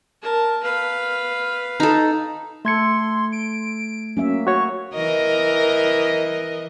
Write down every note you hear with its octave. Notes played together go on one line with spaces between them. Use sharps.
A#4 A5
B4 F5
D#4 A4
A3 A4 C6 G#6 C#7
D7
F#3 A#3 C#4 E5
F#4 C#5 C#6
E3 A#4 D#5